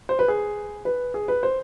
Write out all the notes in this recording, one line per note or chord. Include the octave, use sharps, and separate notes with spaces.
C5
B4
G#4
B4
G#4
B4
C5